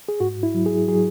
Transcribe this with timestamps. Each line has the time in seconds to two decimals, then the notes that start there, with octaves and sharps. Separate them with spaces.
0.08 G#4
0.20 G#2 F#4
0.43 E4
0.54 F#3
0.66 G#4
0.88 F#3 G#4